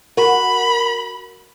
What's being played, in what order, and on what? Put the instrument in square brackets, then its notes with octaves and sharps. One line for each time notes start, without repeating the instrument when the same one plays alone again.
[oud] F#4 [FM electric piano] A#4 [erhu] B5